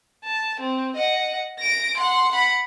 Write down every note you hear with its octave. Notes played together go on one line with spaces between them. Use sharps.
A5
C4
D#5 F#5
A#6 D7
F#5 C6
F#5 B5